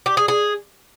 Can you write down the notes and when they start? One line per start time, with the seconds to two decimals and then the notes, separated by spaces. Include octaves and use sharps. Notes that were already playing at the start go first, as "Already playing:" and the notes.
0.06 G4
0.17 G#4
0.28 G#4